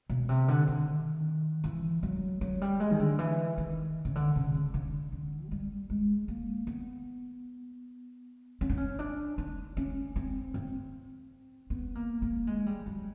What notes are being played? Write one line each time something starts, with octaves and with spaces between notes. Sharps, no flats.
B2
C3
D3
D#3
E3
F#3
F#3
G3
G#3
D#3
D3
E3
D#3
C#3
D3
C#3
C#3
D3
D3
G#3
G3
G#3
A#3
B3
C#4
D4
C#4
D4
D#4
C#4
C4
C4
B3
A#3
A#3
G#3
G3
F#3